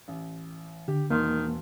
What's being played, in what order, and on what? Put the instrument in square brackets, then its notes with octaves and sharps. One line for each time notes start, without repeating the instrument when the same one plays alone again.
[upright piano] A1
[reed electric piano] D3 [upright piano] G4
[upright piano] E1 C6 [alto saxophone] D#3 [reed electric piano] A#3